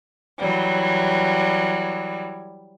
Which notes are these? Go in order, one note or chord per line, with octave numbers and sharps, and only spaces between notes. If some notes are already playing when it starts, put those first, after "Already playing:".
E3 F#3 G3